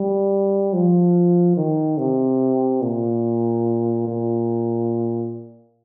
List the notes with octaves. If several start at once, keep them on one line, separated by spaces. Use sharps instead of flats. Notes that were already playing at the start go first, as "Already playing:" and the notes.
Already playing: G3
F3
D#3
C3
A#2
A#2